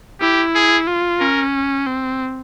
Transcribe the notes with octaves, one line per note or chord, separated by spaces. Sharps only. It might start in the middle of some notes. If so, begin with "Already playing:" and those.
E4 G4
G#4
F4
C#4 A#4
C4